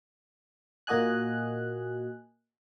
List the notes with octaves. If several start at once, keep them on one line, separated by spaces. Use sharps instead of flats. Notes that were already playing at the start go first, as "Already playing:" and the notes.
A#2 A#3 F#4 D#5 G#5 F#6